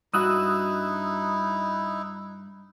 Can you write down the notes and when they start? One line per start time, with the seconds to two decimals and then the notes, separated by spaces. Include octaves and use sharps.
0.14 G2 D#4 E4 F#4 D#6 E6 F#6